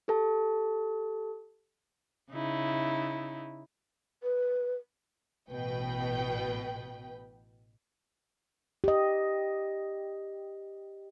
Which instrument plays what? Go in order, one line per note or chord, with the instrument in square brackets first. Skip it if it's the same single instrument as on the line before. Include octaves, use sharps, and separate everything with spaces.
[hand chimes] G4 A4 A5
[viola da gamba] C#3 D#4 E4
[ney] B4
[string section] A1 B2 B4 G5
[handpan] G4 D#5